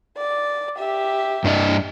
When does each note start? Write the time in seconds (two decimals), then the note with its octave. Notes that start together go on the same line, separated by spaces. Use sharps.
0.17 D5
0.78 G4 E5
1.44 G2 D4 D#5